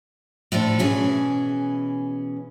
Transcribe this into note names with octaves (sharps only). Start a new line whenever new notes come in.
A2 F3 D4 A4
B2 E3 C#4 G#4